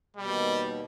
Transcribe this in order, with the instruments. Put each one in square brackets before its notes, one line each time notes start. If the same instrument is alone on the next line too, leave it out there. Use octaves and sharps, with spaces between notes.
[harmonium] D#2 B2 [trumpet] G3